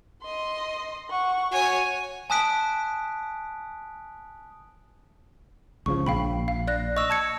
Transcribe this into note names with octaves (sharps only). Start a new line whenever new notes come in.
D#5 C6
F#5 C#6
F#4 C#5 G#5
G#5 A5 D#6 F#6 B6 D7
C#2 C#3 F3 C#6
A#1 F5 G5 B5
F5
D5 F#6 A#6
D#5 C#6 E6
A5 G#6 C#7